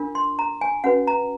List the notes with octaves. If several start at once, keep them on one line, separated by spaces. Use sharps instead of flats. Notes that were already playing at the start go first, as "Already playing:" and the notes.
Already playing: D4 F4 A#4
C6
A#5
G#5
C#4 F#4 B4 F#5
A#5